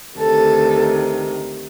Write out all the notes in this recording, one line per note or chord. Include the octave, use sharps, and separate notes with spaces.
D2 C3 D#3 A4